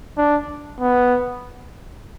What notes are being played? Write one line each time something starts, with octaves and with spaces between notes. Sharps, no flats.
D4
B3